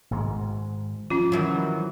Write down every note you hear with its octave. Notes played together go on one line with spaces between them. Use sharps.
G#1 G#2 G#3
F3 C#4 F4
D#3 E3 F#3